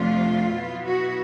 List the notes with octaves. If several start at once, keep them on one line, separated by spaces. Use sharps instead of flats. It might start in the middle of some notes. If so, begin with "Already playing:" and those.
Already playing: F2 C3 F3 A3 D4 F4
B2 F#3 B3 E4
F#4